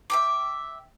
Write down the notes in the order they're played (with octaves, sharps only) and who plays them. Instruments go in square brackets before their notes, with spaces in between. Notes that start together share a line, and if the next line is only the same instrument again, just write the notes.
[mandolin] E5 G5 D6